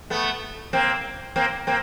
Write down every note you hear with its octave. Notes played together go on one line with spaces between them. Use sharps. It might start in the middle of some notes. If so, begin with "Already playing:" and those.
A3 B3
A#3 C4
A#3 C4
A#3 C4